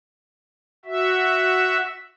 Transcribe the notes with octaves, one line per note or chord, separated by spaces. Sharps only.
F#4 E5